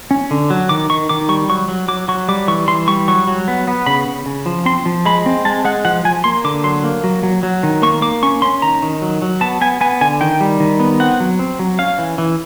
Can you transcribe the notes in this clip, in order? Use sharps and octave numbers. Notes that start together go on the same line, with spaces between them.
C#4
D3
F#3
D#3 D6
D#3 C#6
D#3 D6
G3 C#6
F#3 C#6
F#3
F#3 D6
F#3 C#6
G3 D6
E3 C#6
E3 C6
G3 C#6
F#3 C#6
F#3
B3
B3
C#3 B5
C#3
C#3
F3
C4 C6
F3
G#3 B5
C4
G#3 A5
G#3 F#5
F3 F#5
F3 G#5
A#3 C6
D3 D6
F#3 C6
A#3
F#3
F#3
F#3
D#3
A#3 C#6
A#3 D6
C#4 C#6
C#4 C6
D#3 A#5
D#3
F#3
F#3
B3 A5
B3 G#5
B3 G#5
D3 G#5
D#3 G5
G3
D#3
B3
C4 F#5
F#3
C4
F#3
C#4 F5
E3
E3